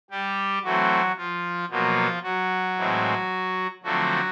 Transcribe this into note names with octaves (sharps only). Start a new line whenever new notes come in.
G3 G4
E3 F#3 A3 C4 F#4
F3 F4
B2 F3 F#3 A#3 F4
F#3 F#4
A2 E3 G#3 C4
D3 F3 F#3 A3 C4 F#4